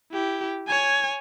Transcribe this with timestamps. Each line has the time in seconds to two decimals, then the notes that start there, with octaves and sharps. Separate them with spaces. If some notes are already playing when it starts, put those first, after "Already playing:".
0.12 E4 G4
0.67 C#5 G#5